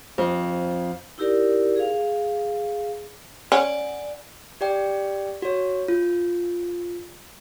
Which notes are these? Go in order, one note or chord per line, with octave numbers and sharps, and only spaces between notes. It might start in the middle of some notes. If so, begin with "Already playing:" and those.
F2
D#4 E4 G4 A#4 D5
G#4 F5
C#4 D5 F#5 G#5
G4 D5 G5
F#4 C#5
F4